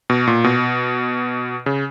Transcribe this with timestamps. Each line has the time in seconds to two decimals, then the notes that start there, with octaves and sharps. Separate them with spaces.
0.10 B2
0.27 A#2
0.44 B2
1.66 C#3